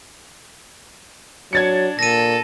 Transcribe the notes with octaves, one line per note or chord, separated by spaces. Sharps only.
F#3 D4 G#6 A6 C#7
A#2 A4 A#6 D#7